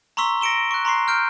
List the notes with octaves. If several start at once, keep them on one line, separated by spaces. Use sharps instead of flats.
A#5 C6 C#6 E6 B6 G7
A#6 C#7 D7 E7 G7
C#6 F#6
A#5 C6 C#6 C7
F6 G6 D7